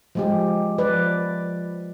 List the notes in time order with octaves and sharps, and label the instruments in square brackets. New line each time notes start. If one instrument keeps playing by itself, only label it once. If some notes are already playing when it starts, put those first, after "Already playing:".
[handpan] F3 G#3 G4
F3 B4 D5